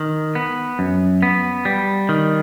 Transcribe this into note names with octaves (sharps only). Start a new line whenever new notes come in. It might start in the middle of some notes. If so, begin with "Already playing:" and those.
Already playing: D#3
B3
F#2
B3
G3
D#3